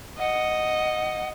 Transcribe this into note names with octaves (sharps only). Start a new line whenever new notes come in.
D#5 F#5